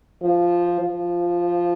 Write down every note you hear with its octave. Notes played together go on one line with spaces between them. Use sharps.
F3
F3